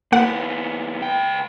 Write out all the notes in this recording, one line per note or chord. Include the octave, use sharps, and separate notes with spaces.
D#2 A#3 B3 F#5
C#2 G5